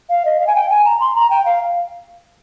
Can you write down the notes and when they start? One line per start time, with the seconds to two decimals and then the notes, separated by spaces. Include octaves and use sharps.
0.09 F5
0.25 D#5
0.39 F5
0.47 G#5
0.55 G5
0.70 G#5
0.85 A#5
1.00 C6
1.15 A#5
1.30 G5
1.45 F5